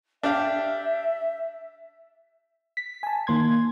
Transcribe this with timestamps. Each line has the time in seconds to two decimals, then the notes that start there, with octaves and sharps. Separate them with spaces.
0.23 D4 G4 E5 F5
2.77 B6
3.03 G#5 A5
3.27 D#3 A#3 C6 G#6